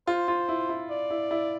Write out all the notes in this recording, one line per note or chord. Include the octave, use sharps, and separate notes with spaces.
F4 C5
F4
E4
E4
D5
E4
E4